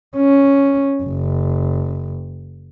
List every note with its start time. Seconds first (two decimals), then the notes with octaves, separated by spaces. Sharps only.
0.17 C#4
1.03 F#1